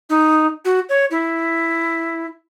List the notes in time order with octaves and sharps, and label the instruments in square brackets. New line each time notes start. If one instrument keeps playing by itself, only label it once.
[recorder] D#4
F#4
C#5
E4